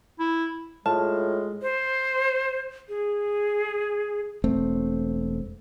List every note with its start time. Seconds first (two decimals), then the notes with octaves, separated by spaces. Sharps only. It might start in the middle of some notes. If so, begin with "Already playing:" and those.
0.19 E4
0.86 A2 G#3 F4 A5
1.62 C5
2.89 G#4
4.44 E1 A3 C4